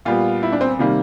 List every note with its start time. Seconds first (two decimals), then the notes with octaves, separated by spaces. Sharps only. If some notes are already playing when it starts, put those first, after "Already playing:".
0.05 A#2 G3 B3 F4
0.43 E4
0.52 D4
0.61 C4
0.79 C3 D#3 G3 A#3